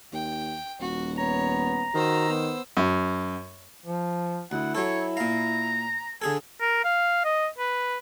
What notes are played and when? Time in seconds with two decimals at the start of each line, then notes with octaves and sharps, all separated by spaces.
0.13 D#2 G5
0.80 D#1 F#4
1.17 B3 C#5 A#5
1.95 D#3 F#4 C5 E6
2.29 B3
2.77 F#2
3.86 F3
4.51 D2 E4 F#5
4.75 F#3 A4 C#5
5.17 A#2 F5 A#5
6.22 D3 G#4 A4 G#5
6.61 A#4
6.84 F5
7.25 D#5
7.58 B4